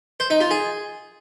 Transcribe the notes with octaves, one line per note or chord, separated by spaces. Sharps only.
C5
D#4
F4
G#4